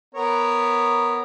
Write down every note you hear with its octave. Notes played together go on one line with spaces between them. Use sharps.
B3 A#4 C#5